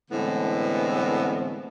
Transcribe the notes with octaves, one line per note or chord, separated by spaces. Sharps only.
A2 D3 E3 G#3 B3 C4